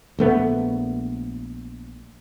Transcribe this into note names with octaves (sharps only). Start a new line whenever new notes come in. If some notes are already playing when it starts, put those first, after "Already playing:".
A#1 A3 B3